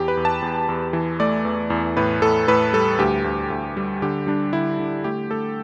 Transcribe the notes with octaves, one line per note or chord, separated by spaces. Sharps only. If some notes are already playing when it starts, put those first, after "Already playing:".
Already playing: E2 G4
B4
E2
A5
E2
E2
E3
A3 D5
E2
E2
A2 B4
A2 A4
A2 B4
G3 A4
D2 G4
D2
D2
G3
D3 G4
G3 D4
D3 E4
D3
A3 G4
A3 A4